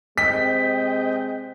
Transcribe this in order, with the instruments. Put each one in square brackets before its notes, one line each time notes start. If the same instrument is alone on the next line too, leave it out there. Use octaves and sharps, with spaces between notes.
[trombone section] C3 G#3 C4 [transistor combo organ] D#5 G5 [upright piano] B6